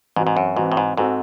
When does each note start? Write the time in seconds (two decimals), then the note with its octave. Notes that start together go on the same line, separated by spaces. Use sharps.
0.16 G#2 E3 C4 F#4
0.27 G#2
0.37 F#2
0.56 G#2 E3 C4 F#4
0.72 A2
0.77 G#2
0.97 G#2 C4 F#4 A4